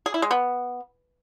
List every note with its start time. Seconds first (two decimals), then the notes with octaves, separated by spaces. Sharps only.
0.06 G#4
0.14 E4
0.22 G#3
0.31 B3